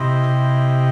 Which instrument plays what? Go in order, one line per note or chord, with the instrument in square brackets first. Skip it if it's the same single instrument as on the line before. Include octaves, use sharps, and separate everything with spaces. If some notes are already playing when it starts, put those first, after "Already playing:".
Already playing: [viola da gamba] C3 [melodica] E4 G4 C5 D#5
[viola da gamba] C3